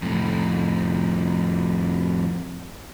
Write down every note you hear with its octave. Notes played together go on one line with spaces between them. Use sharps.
F2 A2